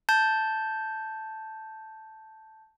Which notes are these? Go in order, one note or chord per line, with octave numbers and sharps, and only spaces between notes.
A5 G6